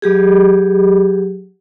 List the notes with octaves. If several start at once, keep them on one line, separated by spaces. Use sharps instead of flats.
F#3 G4 G#4